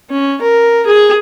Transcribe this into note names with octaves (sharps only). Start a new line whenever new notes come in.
C#4
A#4
G#4